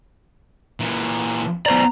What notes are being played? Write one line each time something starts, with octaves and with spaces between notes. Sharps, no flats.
A#2 E3
B3 C5 D5 A#5